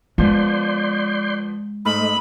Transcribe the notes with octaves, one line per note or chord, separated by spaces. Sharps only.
F3 G#3 B3 D5 C6 G6
G#2 A3 D#5 B5 F6